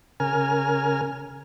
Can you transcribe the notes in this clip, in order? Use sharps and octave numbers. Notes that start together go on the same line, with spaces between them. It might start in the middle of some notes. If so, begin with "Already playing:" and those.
C#3 A#4 G#5 F6